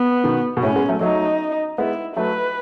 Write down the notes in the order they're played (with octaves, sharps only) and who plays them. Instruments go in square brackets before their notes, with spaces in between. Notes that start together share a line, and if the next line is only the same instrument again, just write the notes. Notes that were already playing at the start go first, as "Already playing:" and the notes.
Already playing: [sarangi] B3
[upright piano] B2 D#3
B2
[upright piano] A2 C#3 [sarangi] C#4
[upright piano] G#3 B3
F#3 A3
[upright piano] F#3 A3 [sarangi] D#4
[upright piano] G#3 B3 [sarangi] E4
[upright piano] F#3 A3 [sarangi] B4